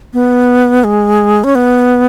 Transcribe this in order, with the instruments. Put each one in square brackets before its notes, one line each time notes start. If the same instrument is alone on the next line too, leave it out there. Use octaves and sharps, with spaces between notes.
[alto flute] B3
G#3
C#4
B3